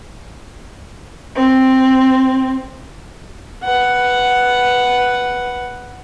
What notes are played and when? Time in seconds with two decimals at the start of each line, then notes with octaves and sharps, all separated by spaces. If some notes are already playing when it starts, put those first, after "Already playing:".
1.35 C4
3.64 B4 F#5